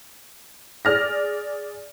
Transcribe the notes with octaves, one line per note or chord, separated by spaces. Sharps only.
G#4 D5 F6 A#6